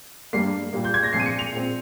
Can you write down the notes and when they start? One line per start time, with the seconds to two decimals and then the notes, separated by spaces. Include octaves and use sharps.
0.33 G2 G3 A#3 C7
0.73 A#2 G3 A#3
0.84 G6
0.94 G#6
1.03 A#6
1.13 A#2 F3 G#3 C4 C7
1.19 D#7
1.26 C#7
1.39 F7
1.52 A#2 G#3 C4